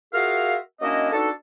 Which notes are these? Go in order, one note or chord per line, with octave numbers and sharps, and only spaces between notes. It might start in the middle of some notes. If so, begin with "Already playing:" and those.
F4 F#4 G#4 A#4 E5 F5
F#3 A#3 C#4 D4 E4 D#5
B3 D4 D#4 F#4 A4